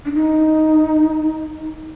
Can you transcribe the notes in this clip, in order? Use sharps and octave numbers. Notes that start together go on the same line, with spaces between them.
D4
D#4